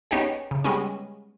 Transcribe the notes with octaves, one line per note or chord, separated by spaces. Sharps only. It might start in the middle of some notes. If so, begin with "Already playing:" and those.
B3 C#4 D#4 G4 G#4
C#3
G3 G#3 B3 C#4